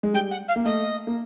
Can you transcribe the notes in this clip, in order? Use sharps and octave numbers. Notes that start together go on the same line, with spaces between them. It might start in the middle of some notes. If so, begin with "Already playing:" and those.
G#3
G3 G5
F#5
F5
A#3
A3 D#5
A#3